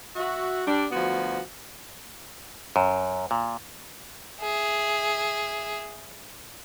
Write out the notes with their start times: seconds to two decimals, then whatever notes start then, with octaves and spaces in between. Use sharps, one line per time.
0.16 F#4 E5
0.66 G3 D4
0.91 D2 F3 B3 F#4
2.76 F#2
3.31 A#2
4.40 G#4 E5